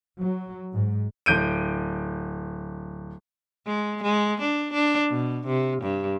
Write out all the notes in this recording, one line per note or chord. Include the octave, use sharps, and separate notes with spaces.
F#3
G#2
D1 G6 D7 D#7
G#3
G#3
D4
D4
B2
C3
G2